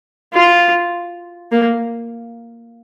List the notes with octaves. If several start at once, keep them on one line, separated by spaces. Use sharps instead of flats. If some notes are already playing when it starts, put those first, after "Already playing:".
F4
A#3